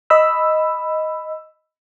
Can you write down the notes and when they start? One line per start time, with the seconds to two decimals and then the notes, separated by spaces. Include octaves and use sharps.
0.10 D#5 B5 E6